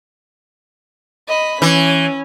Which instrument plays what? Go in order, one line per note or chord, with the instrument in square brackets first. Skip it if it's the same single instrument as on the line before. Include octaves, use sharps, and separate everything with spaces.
[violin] D#5 B5
[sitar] E3 [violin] C#4